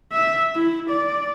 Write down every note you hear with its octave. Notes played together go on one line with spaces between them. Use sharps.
E5
E4
D5